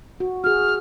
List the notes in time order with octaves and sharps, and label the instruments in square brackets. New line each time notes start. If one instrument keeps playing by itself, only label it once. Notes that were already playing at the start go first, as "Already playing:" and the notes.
[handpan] F#4
[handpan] F#4 G#4 [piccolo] F6